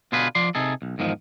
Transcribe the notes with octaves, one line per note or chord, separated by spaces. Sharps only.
B2 D3 F4 G#4 B4
F3 D5 C6
C3 D#4 G#4 A4
B1
E2 G#2 D#3 F3